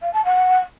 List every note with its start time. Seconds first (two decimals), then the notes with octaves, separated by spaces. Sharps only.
0.01 F5
0.13 A5
0.25 F#5